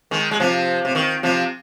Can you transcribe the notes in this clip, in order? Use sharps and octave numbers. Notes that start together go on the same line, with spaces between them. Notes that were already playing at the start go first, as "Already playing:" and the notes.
D#3 G#3
G#3
C3 F3
C3
D#3
C3 F3